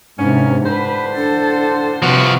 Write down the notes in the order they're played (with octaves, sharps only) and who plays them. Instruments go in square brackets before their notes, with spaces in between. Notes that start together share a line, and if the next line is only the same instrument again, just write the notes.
[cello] G#2 C3 [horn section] A#3 B3 C#4 [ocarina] D4
[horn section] A2 D3 C5 [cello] B4
[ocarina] D4 [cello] A4
[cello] C3 [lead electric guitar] F3 F#4 [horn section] B3